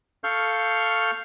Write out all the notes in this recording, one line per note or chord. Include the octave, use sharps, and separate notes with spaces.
A4 F5 C#6 F6 G6